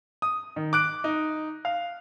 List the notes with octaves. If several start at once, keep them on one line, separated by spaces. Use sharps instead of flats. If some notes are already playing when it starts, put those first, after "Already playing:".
D#6
D#3
D6 F#6 D7
D#4
F5